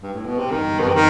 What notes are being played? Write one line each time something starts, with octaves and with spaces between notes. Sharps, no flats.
G2
A2
B2
C3
G1 F#2 D#3 E3 G3
B2
C3
D#3